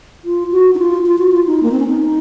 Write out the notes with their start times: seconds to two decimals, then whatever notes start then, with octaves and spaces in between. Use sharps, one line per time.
0.25 F4
0.52 F#4
0.75 D#4
0.79 F4
1.06 F4
1.18 F#4
1.32 F4
1.47 D#4
1.63 A#3
1.71 C4
1.80 C#4
1.87 D#4